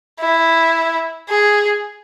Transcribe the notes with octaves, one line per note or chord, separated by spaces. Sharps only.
E4
G#4